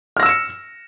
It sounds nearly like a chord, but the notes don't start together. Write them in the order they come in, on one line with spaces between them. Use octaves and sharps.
F6 A#6 E6 E7 C#7